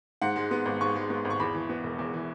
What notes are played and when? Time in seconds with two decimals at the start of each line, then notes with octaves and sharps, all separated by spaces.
0.22 G#2 F#5
0.36 G#3
0.51 B3
0.66 G#1
0.81 G#2 C#6
0.95 G#3
1.10 B3
1.25 G#1
1.30 C#6
1.39 E2 B5
1.55 E3
1.69 B3
1.84 E1
1.99 E2
2.14 E3